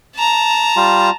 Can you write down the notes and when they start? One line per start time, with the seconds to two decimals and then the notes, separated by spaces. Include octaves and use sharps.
0.15 A5 A#5
0.76 G3 F4